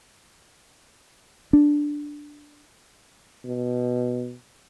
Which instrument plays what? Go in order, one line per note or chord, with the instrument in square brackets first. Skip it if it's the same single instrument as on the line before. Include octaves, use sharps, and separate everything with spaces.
[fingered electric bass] D4
[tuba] B2